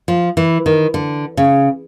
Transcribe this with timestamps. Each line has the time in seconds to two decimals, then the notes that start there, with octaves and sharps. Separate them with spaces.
0.08 F3
0.37 E3
0.66 D#3
0.94 D3
1.37 C#3